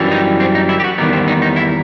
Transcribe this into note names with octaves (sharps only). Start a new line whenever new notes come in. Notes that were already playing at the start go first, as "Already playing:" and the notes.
Already playing: F#2 E3 G3
D#4
C4
D#4
E4
G4
F#4
E2 D#3 G3 B3 D#4
C4
D#4
D#4
E4